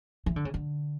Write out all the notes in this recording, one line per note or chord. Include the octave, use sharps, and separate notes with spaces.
E3
D3
C#3
D3